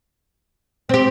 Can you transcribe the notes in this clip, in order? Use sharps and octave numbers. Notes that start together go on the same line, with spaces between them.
C4 G4 C5